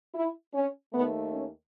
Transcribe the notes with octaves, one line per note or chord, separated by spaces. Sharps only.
E4
C#4
D#2 D#3 A3 B3
C#4